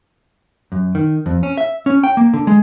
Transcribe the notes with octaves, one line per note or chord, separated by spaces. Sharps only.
F#2
D#3
F2
C#4
E5
C#4
G5
A#3
D3
G#3